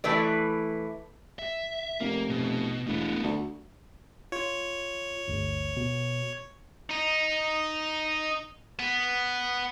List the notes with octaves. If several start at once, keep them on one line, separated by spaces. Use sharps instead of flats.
E3 A3 E4 B4 D5
E5
F1 A#3
B2
E1 A3 B3
D2
F4 C#5
G1 D2
B2
D#4
B3